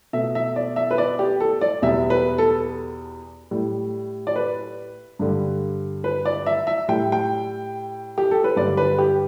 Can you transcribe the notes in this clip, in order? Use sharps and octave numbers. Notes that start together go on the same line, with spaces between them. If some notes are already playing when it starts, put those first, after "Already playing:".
B2 A3 E5
E5
D5
E5
B4
D5
G4
A4
D5
E2 B2 G3 E5
B4
A4
A2 G3
D5
B4
G2 D3 G3
B4
D5
E5
E5
A2 G3 G5
G5
G4
A4
B4
G2 D3 G3 D5
B4
G4